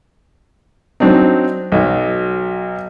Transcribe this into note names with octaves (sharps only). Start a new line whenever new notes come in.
F#3 C4 D4 D#4
B1 F#3